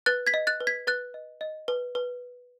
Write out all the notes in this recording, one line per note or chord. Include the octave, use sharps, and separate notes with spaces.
B4 F#6 A6
G#6 B6
D#5
F#6 A6
B4
G#6 B6
B4 F#6 A6
D#5
D#5
B4
B4